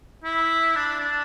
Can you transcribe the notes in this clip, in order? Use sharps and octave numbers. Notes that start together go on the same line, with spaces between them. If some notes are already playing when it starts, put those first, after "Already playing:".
E4
D4
D4